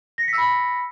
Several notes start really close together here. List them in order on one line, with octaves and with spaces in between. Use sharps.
A#6 C#7 B6 E6 B5